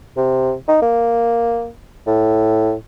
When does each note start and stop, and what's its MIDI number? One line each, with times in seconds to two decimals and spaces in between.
0.17 0.54 48
0.68 0.77 63
0.82 1.68 58
2.07 2.74 45